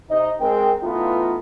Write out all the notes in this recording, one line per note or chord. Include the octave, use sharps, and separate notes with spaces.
C3 D#4 D#5
G#3 C4 A#4 G5
E3 A3 B3 D#4 F4